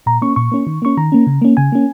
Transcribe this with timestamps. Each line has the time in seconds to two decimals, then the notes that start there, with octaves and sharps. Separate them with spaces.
0.06 A#2 A#5
0.22 A#3 C#4 C#6
0.36 A#2 C#6
0.52 A#3 C#4
0.67 D#3
0.82 A#3 C#4 C#6
0.97 D#3 A#5
1.12 A#3 C#4
1.27 C#3
1.42 A#3 C#4
1.57 C#3 G#5
1.72 A#3 C#4